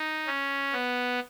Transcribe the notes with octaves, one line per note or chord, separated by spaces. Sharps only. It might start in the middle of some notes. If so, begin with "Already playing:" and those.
Already playing: D#4
C#4
B3